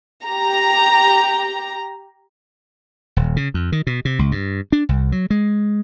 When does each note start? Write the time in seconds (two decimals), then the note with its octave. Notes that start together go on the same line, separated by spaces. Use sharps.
0.25 G4 A#5
3.16 D#1
3.36 C#3
3.54 F2
3.72 D#3
3.87 B2
4.05 C3
4.19 C#2
4.32 G2
4.72 D4
4.89 C2
5.12 F#3
5.30 G#3